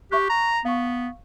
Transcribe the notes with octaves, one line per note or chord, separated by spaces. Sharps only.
G4 E5 C#6 F#6
A#5
B3 F5 C#6